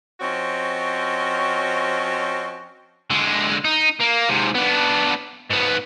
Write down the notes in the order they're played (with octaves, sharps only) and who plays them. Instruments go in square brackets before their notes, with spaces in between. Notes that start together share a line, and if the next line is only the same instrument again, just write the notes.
[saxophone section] F3 C4 C#4 F#4 C#5 D#5
[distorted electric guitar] D3 G#3
D#4
A#3
G#2 C3
B3 D4
G#2 B3